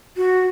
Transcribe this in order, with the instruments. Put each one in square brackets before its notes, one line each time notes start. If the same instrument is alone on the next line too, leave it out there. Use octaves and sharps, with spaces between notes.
[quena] F#4